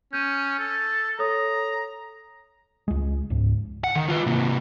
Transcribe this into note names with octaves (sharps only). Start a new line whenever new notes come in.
C#4 G6 D#7
A4
A4 C#5 A#5 D#6
C#2 G#3
C#2 G#2
F#5
D#3
F4 B4
C3 A#3